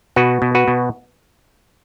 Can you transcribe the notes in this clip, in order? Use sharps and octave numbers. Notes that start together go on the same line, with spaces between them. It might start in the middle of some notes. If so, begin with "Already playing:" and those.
B2 F#4 B4
B2
F#4 B4
B2